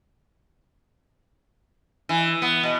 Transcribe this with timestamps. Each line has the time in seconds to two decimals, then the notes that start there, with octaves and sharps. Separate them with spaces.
2.09 E3
2.42 B3
2.63 B2